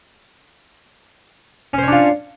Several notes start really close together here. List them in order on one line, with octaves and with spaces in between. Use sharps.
C#4 C5 C#5 D4 F4